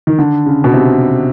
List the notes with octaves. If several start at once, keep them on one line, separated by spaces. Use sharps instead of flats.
D#3
D3
C#3
B2
C3